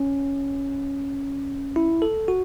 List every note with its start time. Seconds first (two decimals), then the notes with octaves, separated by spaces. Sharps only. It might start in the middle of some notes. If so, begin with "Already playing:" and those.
Already playing: C#4
1.76 E4
2.02 A4
2.28 F#4